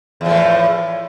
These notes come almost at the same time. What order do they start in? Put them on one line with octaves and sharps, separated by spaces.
E2 F3 A2